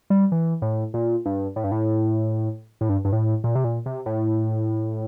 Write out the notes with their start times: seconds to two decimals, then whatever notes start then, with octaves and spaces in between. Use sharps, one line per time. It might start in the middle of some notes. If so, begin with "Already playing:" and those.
0.10 G3
0.32 E3
0.62 A2
0.94 A#2
1.26 G2
1.56 A2
1.64 G2
1.72 A2
2.81 A2
2.89 G2
3.05 G2
3.12 A2
3.44 A#2
3.55 C3
3.64 A#2
3.86 C3
4.06 A2